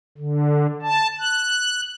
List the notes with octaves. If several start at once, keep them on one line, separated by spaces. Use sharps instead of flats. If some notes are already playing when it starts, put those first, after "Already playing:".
D3
A5
F#6